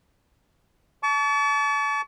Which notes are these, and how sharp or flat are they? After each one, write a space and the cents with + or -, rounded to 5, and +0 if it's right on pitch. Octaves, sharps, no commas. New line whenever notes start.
A5 -25 C#6 +45